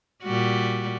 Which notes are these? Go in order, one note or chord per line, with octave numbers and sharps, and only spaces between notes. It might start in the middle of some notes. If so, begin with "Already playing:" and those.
A#2 G3 F#4